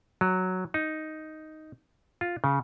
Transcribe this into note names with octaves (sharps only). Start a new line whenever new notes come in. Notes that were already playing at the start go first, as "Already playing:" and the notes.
F#3
D#4
F4
C#3